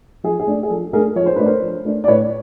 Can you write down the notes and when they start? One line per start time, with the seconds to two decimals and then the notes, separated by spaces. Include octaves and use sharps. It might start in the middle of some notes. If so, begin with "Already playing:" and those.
0.24 F3 G#4
0.40 G#4
0.46 A3 D4
0.63 G#4
0.70 F3 A4
0.93 A3 G#4 A#4
0.96 D4
1.16 F3 C#5
1.26 C5
1.36 A3 D4 B4
1.46 A#4 C5
1.62 F3
1.85 A3 D4
2.04 D5
2.08 A2 B4 C#5